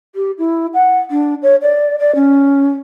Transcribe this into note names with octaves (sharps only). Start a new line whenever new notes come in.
G4
E4
F#5
D4
C#5
D5
D5
C#4